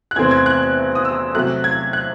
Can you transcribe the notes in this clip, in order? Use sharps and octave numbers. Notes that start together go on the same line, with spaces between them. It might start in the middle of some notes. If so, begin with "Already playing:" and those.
F#6
E2 C3 E3 A3 C4 G#6
G#6
F#6
D#6
E6
C3 F#3 A3 F#6
G#6
F#6